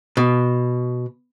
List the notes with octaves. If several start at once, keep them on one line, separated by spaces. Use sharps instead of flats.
B2